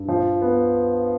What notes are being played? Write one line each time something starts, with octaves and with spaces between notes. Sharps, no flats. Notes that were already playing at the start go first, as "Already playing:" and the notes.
Already playing: G2
F3
B3